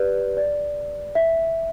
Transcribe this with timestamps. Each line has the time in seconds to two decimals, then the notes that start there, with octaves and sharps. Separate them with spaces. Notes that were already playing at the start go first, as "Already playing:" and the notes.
Already playing: G4 B4 D5
0.37 D5
1.15 E5